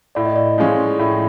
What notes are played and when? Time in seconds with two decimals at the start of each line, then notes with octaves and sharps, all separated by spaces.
0.15 A2 D5
0.26 D#5
0.36 D5
0.58 F3 G#3 C#4
0.99 A2